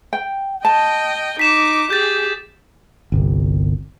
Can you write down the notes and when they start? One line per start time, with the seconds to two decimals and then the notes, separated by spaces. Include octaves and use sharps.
0.13 G5
0.65 D#5 G5 A5
1.39 D#4 D6 B6 E7
1.90 G4 G#4 G6 A6
3.12 G1 C2